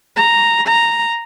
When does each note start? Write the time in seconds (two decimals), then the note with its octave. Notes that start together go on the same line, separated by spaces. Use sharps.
0.17 A#5
0.68 A#5